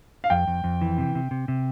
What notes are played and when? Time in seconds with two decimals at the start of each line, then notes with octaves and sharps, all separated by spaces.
0.24 F5
0.30 F2 G5
0.47 F2
0.64 F2
0.82 E3
0.98 C3
1.15 C3
1.31 C3
1.48 C3